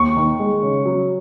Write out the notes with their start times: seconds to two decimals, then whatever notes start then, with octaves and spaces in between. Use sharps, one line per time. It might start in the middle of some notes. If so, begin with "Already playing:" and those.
Already playing: D#2 C#6
0.17 D#3
0.40 G#3
0.62 C#3
0.85 F#3